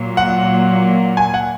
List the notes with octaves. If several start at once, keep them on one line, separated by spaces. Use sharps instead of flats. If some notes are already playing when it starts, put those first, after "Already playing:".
Already playing: A#2 F#3 A#3
F#5
G#5
F#5